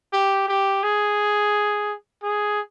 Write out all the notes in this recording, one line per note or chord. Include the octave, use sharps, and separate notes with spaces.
G4
G4
G#4
G#4